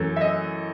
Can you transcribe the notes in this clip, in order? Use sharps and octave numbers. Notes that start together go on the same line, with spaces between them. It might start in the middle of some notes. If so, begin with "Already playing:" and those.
Already playing: F#2 E3 A3
E5
D#5